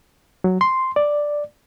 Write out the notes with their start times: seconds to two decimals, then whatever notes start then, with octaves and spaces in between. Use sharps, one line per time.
0.44 F#3
0.61 C6
0.96 D5